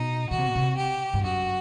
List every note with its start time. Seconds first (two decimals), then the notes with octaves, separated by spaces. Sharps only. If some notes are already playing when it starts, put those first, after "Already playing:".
Already playing: B2 D#4
0.30 D#3 F#4
0.38 C3
0.46 B2
0.55 C3
0.77 G4
1.14 G2
1.23 F#2 F#4